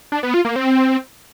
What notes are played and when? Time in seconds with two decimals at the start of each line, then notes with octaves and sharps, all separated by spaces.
0.12 D4
0.23 B3
0.34 F4
0.45 A#3
0.56 C4